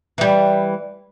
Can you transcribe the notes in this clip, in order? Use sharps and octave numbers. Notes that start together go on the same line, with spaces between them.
E3 G3